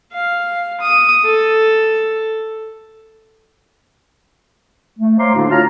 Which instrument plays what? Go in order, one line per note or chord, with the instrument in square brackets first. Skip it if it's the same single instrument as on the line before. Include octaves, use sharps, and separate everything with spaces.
[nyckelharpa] F5
D#6
A4
[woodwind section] A3
C5 C#5 F5 A#5 C6 D6
A2 D3 A3 A#3 D4 F#4
F4 F#4 C#5 A5 A#5 F6